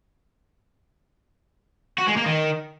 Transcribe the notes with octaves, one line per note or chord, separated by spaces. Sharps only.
F#4
G#3
A#3
D#3